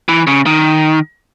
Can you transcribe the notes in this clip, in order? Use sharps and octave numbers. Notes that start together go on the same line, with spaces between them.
E3
C#3
D#3